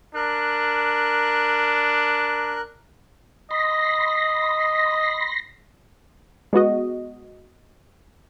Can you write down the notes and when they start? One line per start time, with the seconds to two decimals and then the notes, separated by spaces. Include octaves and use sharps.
0.15 D4 A#4 F#6
3.51 D#5 B5 C6 A#6
6.53 G#3 B3 F#4 D#5